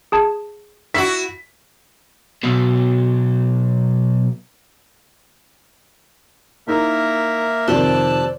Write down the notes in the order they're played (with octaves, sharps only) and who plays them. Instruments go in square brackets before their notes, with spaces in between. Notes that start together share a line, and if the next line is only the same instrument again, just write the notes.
[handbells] G#4 A5 G#6
[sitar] E4 F#4 [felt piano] B6
[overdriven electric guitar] B1 B2
[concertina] A#3 A#4 E5 [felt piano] D#4 E4
[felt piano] F2 C3 D#3 [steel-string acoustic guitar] C5 D5 [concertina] A5 E6 F#6